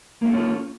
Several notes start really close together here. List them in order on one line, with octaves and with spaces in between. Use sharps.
A#3 E4 A4 C#4 F4